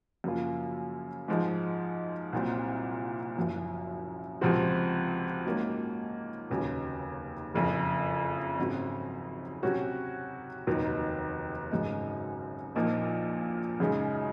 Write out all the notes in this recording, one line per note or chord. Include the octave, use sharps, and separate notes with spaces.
F#2 C#3 F3 A#3 F4
G#2 F3 G#3 D#4
C2 A#2 F#3 C4
F#1 F#2 F3
C#2 C3 F3 C4 F#4
G#2 F#3 A#3 C#4
F1 D#2 C#3 F#3 C#4
F#1 F2 C#3
G#1 F#2 C#3 F#3 C4
C3 F#3 C#4 F#4
F1 D#2 D#3 F#3
G#1 F#2 C#3 G#3 D#4
A#1 A#2 F3 A#3 D#4
F#2 C#3 G#3 D#4 G#4